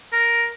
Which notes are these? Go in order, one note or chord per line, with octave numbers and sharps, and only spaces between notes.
A#4